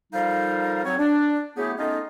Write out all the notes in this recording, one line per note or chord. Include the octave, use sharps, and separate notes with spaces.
F3 G3 D#4 A4 A#4 F5
F#3 C4 C#5
D4
F#3 A3 B3 E4 G4 G#4
A3 B3 C#4 D#4 F4 D#5